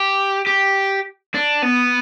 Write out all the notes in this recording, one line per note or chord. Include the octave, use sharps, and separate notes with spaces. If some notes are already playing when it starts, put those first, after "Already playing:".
Already playing: G4
G4
D4
B3